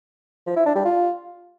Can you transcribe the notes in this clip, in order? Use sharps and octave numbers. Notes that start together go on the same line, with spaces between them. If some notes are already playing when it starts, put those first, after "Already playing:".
F3
E4
D4
G3
F4